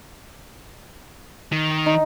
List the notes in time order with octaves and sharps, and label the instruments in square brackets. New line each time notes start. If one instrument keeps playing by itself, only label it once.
[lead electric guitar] D#3
[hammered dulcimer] D#4